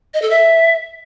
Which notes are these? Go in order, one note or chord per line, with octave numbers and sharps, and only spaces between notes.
D#5
A4
E5